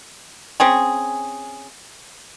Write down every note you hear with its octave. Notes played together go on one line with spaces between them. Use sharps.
C4 C#4 G#4